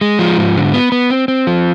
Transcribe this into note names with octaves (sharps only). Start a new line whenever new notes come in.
G#3
F3
G#2
D3
B3
B3
C4
C4
F3